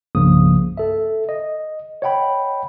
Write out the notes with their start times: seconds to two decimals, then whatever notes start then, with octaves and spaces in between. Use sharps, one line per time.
0.15 C2 G2 C#3 F3 A#3 D#6
0.77 A4 E5
1.29 D#5
2.02 C#5 D#5 F#5 G5 B5